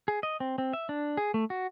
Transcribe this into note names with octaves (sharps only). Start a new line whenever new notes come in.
G#4
D#5
C4
C4
E5
D4
G#4
A3
F#4